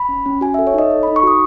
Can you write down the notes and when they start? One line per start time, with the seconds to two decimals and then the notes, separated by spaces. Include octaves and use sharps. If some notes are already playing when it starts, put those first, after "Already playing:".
Already playing: B5
0.09 C#4
0.26 C#4
0.41 F#4 G#5
0.54 A4 E5
0.67 C#5
0.74 D#4 D#5
0.90 A4
1.03 D#4 B5
1.16 C#6
1.23 F#4 D#6